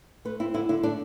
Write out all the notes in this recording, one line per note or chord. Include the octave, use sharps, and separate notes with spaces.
A3 B4
C4 E4
D3 E4
D3 E4
A3 D4